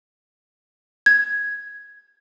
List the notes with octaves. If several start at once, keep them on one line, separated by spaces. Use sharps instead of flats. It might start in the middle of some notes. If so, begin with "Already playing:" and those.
G#6